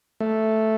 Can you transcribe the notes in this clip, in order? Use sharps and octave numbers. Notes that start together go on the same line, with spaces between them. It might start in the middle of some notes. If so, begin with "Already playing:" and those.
A3